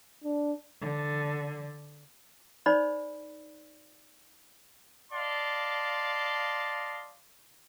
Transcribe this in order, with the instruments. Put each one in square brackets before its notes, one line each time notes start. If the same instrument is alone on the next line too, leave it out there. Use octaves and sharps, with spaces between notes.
[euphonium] D4
[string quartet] D3
[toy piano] D#4 C5 D5 B5
[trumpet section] D5 D#5 F5 A5 C6